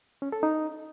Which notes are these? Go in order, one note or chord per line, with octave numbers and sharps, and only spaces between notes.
C#4
A4
D#4